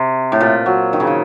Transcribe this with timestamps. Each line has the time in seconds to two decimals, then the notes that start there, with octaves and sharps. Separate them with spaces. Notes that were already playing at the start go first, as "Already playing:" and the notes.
Already playing: C3
0.32 A2
0.41 A#2
0.66 F#3
0.93 D#3
1.00 C#3
1.07 D#3